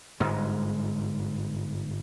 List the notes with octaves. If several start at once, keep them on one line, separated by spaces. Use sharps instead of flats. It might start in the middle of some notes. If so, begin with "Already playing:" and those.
G1 G#2 G#3